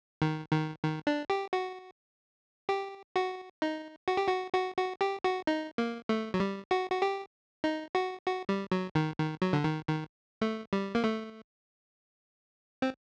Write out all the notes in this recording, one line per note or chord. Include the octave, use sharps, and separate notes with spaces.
D#3
D#3
D#3
D4
G4
F#4
G4
F#4
D#4
F#4
G4
F#4
F#4
F#4
G4
F#4
D#4
A#3
A3
F#3
G3
F#4
F#4
G4
D#4
F#4
F#4
G3
F#3
D#3
D#3
F#3
D3
D#3
D#3
A3
G3
A#3
A3
C4